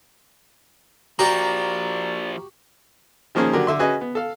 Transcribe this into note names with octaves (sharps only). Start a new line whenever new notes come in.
F3 A#3 F#4 G4 D5 A#5
D#3 F3 A#3 C#4 G#4 A#4
D3 F#3 G4 A#4
D3 E5 C6
C#4 F#4 G#4 B4 D#5 G#5
B3
A4 F5